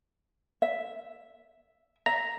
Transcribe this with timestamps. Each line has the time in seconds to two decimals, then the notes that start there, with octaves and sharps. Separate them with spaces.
0.62 E5
2.06 E5 A#5